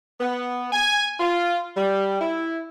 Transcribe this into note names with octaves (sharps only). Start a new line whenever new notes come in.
B3
G#5
F4
G3
E4